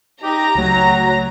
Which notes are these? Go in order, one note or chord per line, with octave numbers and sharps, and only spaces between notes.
D#4 G4 A#5 A#6
C#2 F#3 A3